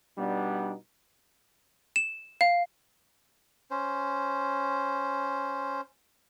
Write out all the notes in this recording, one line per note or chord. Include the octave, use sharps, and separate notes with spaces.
B2 G3 B3 D4 D#4
E7
F5
C#4 C5